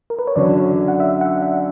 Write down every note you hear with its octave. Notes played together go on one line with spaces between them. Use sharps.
A#4
B4
C#5
F#2 D3 F#3 C#4 D5
F#5
E5
F#5
E5